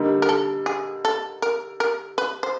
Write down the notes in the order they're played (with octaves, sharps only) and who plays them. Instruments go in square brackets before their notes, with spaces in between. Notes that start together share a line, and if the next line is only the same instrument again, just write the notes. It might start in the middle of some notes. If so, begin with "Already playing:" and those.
Already playing: [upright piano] D3 G3 A#3 D#4
[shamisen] A#4
A4
G#4
A4
A#4
A#4
B4
C5